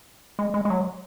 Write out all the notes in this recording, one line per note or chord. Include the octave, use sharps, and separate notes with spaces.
G#3
G#3
G#3
F#3